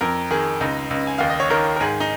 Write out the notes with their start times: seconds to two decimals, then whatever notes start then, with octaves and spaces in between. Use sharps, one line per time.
0.01 F2 A#4
0.31 D#3 G#4
0.61 C#2 D#4
0.90 C#2
1.07 G#5
1.18 D#2 F5
1.29 D#5
1.40 C#5
1.50 D#3 A#4
1.76 A#4
1.81 G#2 G#4
2.00 D#4